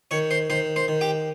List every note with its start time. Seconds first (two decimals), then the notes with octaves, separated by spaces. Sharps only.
0.11 D#3 C#5 C#6
0.31 C5 C6
0.50 D#3 C5 C6
0.76 C5 C6
0.88 D#3
1.01 G4 G5